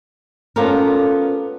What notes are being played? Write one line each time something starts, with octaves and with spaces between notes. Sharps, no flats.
B3 C#4 F4 G4 A4 A#4